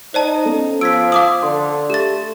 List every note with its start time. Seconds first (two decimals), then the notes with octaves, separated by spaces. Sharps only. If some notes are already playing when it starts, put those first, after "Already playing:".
0.14 D#4 C5 D5 A5
0.45 B3 C#4 A4
0.81 F3 E6 G#6 B6 D7
1.12 F5 D6 D#6
1.43 D3 C6
1.90 A3 G4 A6